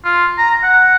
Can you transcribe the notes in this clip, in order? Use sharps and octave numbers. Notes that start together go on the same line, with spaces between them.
F4
A#5
F#5